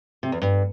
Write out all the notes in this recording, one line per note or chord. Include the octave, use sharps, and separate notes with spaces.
C3
E2
G2